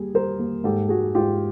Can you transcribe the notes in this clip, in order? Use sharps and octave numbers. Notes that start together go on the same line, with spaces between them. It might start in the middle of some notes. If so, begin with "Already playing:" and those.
Already playing: G3 A#3 G#4
G3 A#4 C5
A#3
G#2 G4 A4
G#2 F#4 G#4
G#2 F4 G4